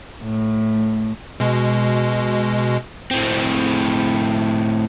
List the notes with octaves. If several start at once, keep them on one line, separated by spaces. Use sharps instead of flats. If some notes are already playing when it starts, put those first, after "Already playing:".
A2
B2 G#3
A2 C4